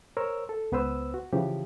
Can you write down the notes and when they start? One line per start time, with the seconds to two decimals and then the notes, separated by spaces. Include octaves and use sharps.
0.17 A#4 C5 C#5 E6
0.49 A4
0.72 C#2 B3 B4 C5 E6
1.14 F#4
1.33 C#3 E3 F3 G4